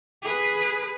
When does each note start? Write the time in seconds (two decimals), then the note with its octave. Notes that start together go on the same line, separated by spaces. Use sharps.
0.22 G#4 B4